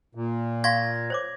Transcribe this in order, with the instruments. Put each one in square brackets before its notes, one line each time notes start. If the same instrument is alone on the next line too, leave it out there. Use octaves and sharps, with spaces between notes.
[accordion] A#2
[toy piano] F5 C6 C#6 [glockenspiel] G#6 A#6
[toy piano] C5 C#5 D6